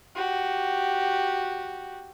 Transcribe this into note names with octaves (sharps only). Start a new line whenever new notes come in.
F#4 G4